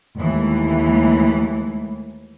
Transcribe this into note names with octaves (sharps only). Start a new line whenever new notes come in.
D#2 E3 G#3 A3